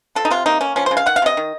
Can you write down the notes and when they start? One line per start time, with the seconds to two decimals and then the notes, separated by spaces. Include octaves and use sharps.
0.15 F3 A4
0.25 D#4
0.30 C3 F4
0.46 A#3 D#4
0.61 A#3 C#4
0.76 F3 C#4
0.86 C#3 C5
0.97 F5
1.06 D#3 F#5
1.16 F5
1.22 C3 D#5
1.37 D#3